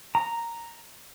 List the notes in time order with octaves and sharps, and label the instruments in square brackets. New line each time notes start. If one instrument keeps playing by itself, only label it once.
[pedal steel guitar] A#5